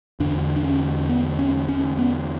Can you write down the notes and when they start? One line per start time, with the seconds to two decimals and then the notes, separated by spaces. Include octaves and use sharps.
0.20 E2 D3 D4
0.56 D4
0.64 C#4
1.09 B3
1.39 C#4
1.69 C#4
1.99 B3